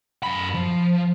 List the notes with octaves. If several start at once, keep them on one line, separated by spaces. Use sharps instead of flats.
F#2 B5
F3